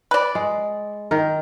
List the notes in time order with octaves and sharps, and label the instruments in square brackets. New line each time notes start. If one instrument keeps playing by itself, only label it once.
[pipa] B4 D5
[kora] G#3
D#3 A#4